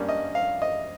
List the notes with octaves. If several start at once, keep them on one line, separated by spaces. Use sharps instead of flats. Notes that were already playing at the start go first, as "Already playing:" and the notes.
Already playing: G2 G3 A#3 C#4
D#5
F5
D#5